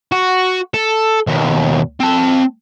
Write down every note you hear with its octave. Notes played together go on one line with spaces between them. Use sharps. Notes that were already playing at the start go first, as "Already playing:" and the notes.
F#4
A4
D#2 B2
C4 A5